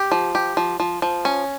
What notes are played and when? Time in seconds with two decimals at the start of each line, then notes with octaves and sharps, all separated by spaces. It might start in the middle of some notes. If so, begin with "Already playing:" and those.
Already playing: G4
0.12 F3
0.35 G4
0.57 F3
0.80 F3
1.02 F3
1.25 C#4